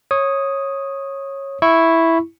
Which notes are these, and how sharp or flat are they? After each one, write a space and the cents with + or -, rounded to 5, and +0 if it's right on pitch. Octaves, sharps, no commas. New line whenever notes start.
C#5 -15 D#6 +0
E4 +0 C#6 -10